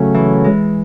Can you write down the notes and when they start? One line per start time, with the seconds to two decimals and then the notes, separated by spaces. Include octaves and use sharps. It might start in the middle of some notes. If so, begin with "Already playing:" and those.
Already playing: C#3 F#3 A3 C#4
0.14 E3
0.44 G#3